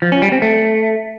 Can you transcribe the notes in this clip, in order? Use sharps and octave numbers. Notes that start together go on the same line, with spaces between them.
F3
C#4
G3
C4
A3